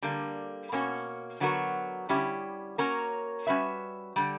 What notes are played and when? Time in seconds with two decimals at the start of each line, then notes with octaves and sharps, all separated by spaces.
0.02 D3 G3 A#3
0.72 B2 A#3 C#4 F#4
1.40 D3 F#3 B3 F#4 A#4
2.09 D3 G3 C#4 E4 G4
2.78 A#3 C#4 F#4 A#4 C#5
3.47 G3 C#4 F#4 B4 E5
4.16 D3 G3